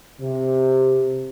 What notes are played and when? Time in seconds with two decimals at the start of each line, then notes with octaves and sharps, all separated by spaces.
0.22 C3